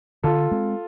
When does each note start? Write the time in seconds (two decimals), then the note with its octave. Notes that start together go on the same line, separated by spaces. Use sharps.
0.23 D3 F4 A4
0.52 G#3 C4